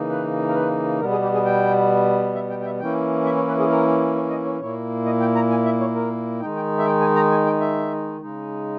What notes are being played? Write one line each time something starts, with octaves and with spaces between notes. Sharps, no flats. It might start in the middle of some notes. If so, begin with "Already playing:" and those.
Already playing: C#3 E3 A#3 D#4
B4
A#4
B4
B2 G3 B3 A#4
G#4
G4
G#4
G5
E5
G5
G5
E5
E3 A#3 C#4 E4 G5
E5
C#5
B4
G#4
A#4
C#5
D#5
C#5
A#2 A#3 E4 C#5
D#5
G5
A#5
G#5
E5
C#5
A#4
D#3 G#3 D#4 G5
G5
E5
G5
G#5
A#5
G#5
G5
E5
C#3 G#3 D#4